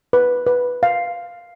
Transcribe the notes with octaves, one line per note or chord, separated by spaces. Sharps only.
B4
B4
F5